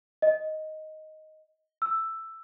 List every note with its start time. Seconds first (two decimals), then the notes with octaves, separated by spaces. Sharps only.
0.22 D#5
1.82 E6